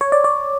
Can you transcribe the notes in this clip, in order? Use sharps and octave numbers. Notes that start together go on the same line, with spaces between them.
C#5
D5
D5